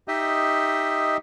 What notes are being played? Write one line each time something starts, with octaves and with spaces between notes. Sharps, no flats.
D#4 G4 D#5 E5